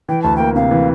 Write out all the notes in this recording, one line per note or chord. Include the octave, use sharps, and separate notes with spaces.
E3 G5
D2 A5
A#3 G5
C3 F5
E3